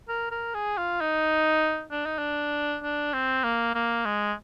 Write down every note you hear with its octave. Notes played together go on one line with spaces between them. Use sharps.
A#4
A#4
G#4
F4
D#4
D4
D#4
D4
D4
C4
A#3
A#3
G#3